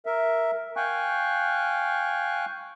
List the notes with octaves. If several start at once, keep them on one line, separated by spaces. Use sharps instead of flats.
A#4 E5
F5 G5 G#5 C#6 F#6